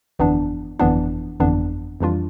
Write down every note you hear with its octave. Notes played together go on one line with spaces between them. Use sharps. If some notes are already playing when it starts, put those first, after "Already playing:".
G1 F2 E3 B3 D4
G1 F2 E3 B3 D4
G1 F2 E3 B3 D4
F2 E3 G3 D4 F4